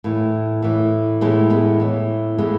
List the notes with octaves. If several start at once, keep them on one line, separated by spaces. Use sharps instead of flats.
A2 E3
A2 E3
A2 E3 G#3 B3
G#3 B3
A2 E3
A2 E3 G#3 B3